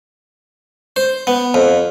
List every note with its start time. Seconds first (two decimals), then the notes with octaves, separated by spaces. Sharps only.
0.96 C5
1.27 B3
1.54 F2